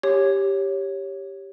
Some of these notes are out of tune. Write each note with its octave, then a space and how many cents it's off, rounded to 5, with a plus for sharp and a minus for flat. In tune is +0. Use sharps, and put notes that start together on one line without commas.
G4 +0 C#5 +0